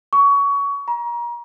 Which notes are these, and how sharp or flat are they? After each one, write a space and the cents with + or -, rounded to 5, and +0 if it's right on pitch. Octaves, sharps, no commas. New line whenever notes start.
C#6 +25
A#5 +30